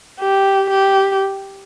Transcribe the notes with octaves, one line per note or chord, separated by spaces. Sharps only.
G4
G4